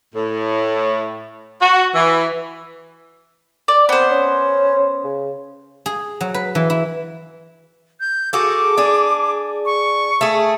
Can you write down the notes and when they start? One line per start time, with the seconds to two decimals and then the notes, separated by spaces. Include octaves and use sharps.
0.15 A2
1.62 F#4
1.95 E3
3.68 D5
3.89 B3 C4 C5
4.11 C#4
5.04 C#3
5.86 G#4
6.21 F#3
6.34 B4
6.55 E3
6.70 E4
8.00 G6
8.33 F#4 G#4 A4 D6
8.77 D4 G#4
9.66 C#6
10.21 A3 G#4